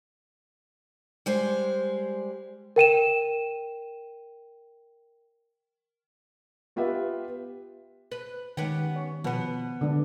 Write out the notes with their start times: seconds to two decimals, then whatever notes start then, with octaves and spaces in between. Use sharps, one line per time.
1.26 G3 G#3 C5
2.76 A#4 G5 D#7 E7
6.76 B3 F4 G4 B4 E5
8.12 B4
8.57 D#3 G#3 B3 C#4 G4
8.96 C#5
9.24 B2 F3 B3 B4
9.81 D3 G#3 D4